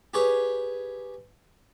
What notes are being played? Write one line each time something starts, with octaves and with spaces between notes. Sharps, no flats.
G4 G#4 B4 C#5